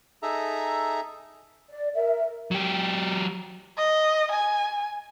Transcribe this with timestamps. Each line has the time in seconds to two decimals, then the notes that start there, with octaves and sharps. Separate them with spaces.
0.23 D#4 G#4 A4 E5 A#5
1.70 D5
1.94 A#4 E5
2.51 F#3 G4
3.77 D#5
4.32 G#5